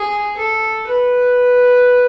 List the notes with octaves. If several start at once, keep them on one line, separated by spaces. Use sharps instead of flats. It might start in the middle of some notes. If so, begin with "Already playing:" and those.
Already playing: G#4
A4
B4